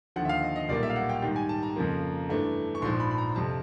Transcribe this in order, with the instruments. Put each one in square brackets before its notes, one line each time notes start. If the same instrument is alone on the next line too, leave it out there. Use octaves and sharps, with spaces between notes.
[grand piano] D#2 D3 F3 F#5
E5
F5
D#5
D#5
B1 A#2 G3 A#3 D5
E5
F5
F#5
G5
G#2 D#3 G3 G5
G#5
A5
A#5
F2 C#3 F3 A#3
G2 E3 A3 D4
C#6
A#1 G#2 F3 C6
B5
B5
A#5
F2 C3 F3 A5